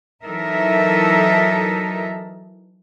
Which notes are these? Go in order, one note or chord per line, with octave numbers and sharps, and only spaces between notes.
E3 F#3 D#4 A4 A#4 E5